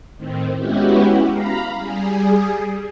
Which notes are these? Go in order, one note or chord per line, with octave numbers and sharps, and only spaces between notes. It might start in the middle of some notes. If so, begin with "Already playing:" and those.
A2 D#3 C4
G#3 B3 C#4 E4 F#4 G4
F5 A#5 B5
G3 G#4